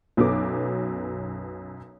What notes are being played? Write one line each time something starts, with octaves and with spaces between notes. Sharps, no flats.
B1 F#2 F#3 B3 A4 D6